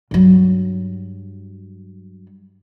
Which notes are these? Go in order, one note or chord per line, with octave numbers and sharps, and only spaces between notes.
G2 F#3